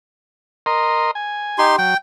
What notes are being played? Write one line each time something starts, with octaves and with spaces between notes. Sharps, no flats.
A#4 D#5 C6
G#5
D#4 G4 C6
F#3 G5